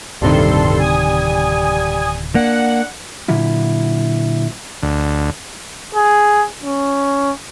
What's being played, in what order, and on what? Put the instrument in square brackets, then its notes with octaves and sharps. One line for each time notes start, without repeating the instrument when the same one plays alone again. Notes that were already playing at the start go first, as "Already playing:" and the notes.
[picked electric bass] D1 C3 D#3 [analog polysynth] G2 A4 C6 [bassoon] G3
[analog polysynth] G#5 D#6
[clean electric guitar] A#3 [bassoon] D4 [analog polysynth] F#5
[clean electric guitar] A#2 D3 F#3 E4 F4
[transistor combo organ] D2
[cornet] G#4
C#4